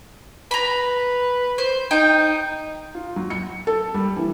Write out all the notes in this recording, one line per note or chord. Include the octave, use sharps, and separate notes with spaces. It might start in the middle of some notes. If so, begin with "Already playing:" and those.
B4 A#5 B5
C5
D#4 G5
F4
F#3
C#7
A4
G3
E3